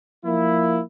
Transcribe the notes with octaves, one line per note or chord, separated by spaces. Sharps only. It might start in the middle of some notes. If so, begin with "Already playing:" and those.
F3 A#3 E4